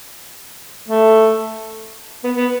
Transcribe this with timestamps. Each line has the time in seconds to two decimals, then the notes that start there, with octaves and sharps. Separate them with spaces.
0.88 A3
2.24 B3
2.36 B3